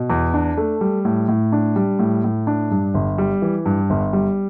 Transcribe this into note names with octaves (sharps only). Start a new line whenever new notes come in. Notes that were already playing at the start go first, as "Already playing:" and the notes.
Already playing: B2
E2
D4
A3
G3
A2
A2
D4
G3
A2
A2
D4
G2
G1
G3
E3
G2
G1
G3